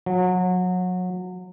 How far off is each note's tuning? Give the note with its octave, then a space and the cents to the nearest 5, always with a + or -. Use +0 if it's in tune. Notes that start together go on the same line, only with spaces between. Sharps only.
F#3 -25